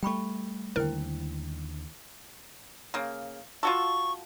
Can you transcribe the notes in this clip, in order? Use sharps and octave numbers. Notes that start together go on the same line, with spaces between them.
G3 A3 G5 B5 C#6
D#2 D3 E4 A#4 C5 G5
C#3 A#3
F4 F#4 A4 C#6